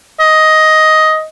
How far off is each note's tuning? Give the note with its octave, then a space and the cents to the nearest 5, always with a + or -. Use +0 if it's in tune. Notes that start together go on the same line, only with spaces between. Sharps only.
D#5 +10